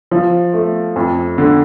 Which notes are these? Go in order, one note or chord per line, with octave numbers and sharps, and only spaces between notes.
F3
A3
F2
D3